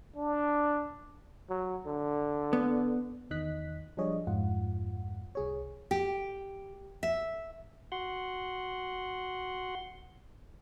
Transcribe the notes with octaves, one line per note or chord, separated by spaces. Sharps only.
D4
F#3
D3
B3
E2 D#3 D#5 F#6 B6
F3 G3 D4 G#4 C#5 D#5
F2 G#2 F4 F#5
C2 G#4 C#5
G4
E5
F#4 F#5 C6